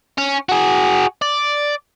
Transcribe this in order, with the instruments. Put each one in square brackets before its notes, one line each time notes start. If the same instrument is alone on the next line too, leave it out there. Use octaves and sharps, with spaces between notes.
[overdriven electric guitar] C#4
F#4 G#4
D5